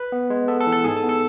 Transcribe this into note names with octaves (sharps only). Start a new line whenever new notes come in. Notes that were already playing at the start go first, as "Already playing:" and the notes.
Already playing: B4
B3
G#3
B3 A4
A4
E3
A4
G#2 G#4
A4
B3
A4